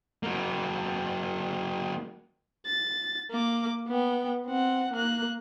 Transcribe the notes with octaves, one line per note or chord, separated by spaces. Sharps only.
F#3 A#3
A6
A#3 D6
B3 G5
C4 F#5
A#3 F#6